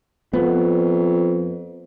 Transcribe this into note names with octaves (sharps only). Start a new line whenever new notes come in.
F2 B3